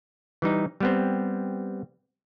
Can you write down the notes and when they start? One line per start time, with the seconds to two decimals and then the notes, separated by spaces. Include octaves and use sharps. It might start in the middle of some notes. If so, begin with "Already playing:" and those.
0.42 E3 G3 D#4
0.80 G3 B3 C4